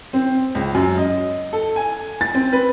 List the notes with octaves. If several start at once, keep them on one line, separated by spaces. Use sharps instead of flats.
C4
C#2
F#2
D#5
A4
G#5
A6
C4
B4